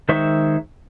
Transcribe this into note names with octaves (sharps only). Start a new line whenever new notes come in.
D#3 G#3 C5 E5 C#6